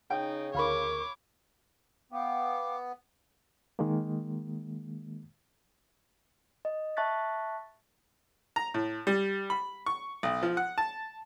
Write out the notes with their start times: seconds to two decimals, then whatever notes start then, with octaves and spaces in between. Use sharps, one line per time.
0.10 C#3 D#4 G5
0.54 D2 A#4 C#5 F5 B5 C#6 D6
2.12 B3 F5 G5 D6
3.79 D#3 G#3 A#3
6.65 D#5
6.97 E5 A5 C#6 F#6 A6 B6
8.56 A#5
8.74 A2
9.07 G3
9.50 B5
9.86 C#6
10.23 B1
10.43 F3
10.57 F#5
10.78 A5